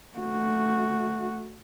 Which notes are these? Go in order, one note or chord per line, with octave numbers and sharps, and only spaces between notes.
A3 F#4